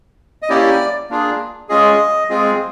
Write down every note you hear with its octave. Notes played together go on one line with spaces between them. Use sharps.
D#5
A#3 C#4 E4 G4 D5
A#3 D4 F4 G#4
G#3 C#4 F4 G#4 D#5
G#3 C4 F4 G#4